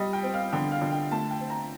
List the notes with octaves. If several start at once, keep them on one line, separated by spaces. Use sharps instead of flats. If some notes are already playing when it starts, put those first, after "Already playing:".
Already playing: G3 D#5
G5
C4
F5
D3 G5
F5
D3
G5
A3 A5
G5
C4
A#5